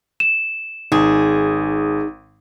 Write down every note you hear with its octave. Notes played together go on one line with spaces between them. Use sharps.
E7
G#1 D#4 G#4